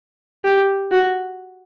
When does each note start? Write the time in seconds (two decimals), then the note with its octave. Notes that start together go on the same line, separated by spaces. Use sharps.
0.44 G4
0.92 F#4